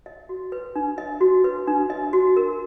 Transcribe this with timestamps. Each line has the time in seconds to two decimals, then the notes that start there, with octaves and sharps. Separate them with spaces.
0.06 D#5
0.29 F#4
0.52 B4
0.76 D4
0.98 D#5
1.21 F#4
1.44 B4
1.67 D4
1.90 D#5
2.13 F#4
2.36 A#4